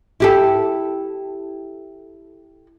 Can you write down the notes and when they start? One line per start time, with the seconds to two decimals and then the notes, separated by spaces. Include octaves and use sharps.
0.20 E4 G4 A4